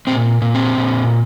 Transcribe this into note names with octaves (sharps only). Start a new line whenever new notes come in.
A#2 C4
A#2
C4
A#2